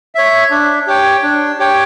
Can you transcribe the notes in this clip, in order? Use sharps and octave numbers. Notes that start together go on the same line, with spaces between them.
C#5 E5
D4
G4 C#5 G5
D4
G4 C#5 G5